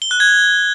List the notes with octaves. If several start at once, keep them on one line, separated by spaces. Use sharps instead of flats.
G7
F#6
G#6